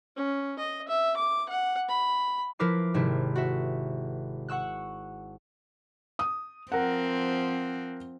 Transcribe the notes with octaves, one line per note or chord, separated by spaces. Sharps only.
C#4
D#5
E5
D6
F#5
B5
F3 E4 A#4 B4 D6 C7
G#1 C3 E4
F#4 E5
F#5 C#6 E6 F#6
D#6
F3 C4 A#4 F#5